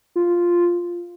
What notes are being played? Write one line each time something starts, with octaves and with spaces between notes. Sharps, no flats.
F4